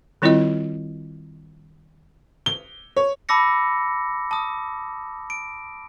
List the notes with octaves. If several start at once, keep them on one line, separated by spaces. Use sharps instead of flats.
D#3 G3 C4 E4 F4 D#5
G7
C#5
A5 B5 D6 E6 A#6 C#7
A5 D#6
D7